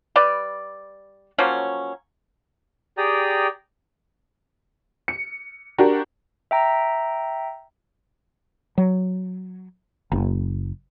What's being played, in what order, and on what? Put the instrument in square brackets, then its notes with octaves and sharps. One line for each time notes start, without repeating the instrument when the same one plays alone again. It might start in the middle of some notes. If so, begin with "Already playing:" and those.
[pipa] G3 B4 D5
F3 F#3 A#3 C#4
[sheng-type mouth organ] G4 G#4 D5 G5 A#5 D#6
[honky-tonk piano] C#7
D4 F#4 G4 A#4
[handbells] E5 G5 A#5
[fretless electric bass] F#3
F#1